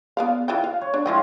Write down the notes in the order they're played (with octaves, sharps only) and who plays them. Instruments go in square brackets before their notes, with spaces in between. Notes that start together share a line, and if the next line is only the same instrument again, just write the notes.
[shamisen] B3 D5 F5
E3 F4 G5
F5
[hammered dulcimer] C#5
[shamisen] D4
[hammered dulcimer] F3 G#3 F4 [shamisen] E4 D#5 G5